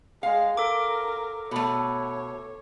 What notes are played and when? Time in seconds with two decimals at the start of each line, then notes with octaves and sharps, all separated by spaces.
0.23 G#3 F5
0.57 A4 A#4 D6
1.51 B2 A3 C#5